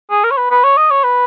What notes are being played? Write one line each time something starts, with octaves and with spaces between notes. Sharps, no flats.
G#4
A#4
C#5
B4
B4
C#5
D#5
C#5
B4